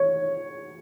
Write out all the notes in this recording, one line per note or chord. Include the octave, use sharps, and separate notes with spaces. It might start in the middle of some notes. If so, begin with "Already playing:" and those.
Already playing: C#5